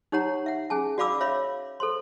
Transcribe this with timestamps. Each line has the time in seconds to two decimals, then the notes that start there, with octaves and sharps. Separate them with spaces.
0.12 D#4 G4 C#5 F#5 A#5
0.46 E5 F#5
0.70 C#4 G#4 G#5 A5
0.98 F#4 D5 F5 B5 D6 E6
1.21 C#5 E5 F5 B5
1.80 A4 C5 C6